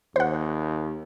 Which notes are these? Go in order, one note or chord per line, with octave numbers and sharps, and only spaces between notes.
D#2 C5 F#5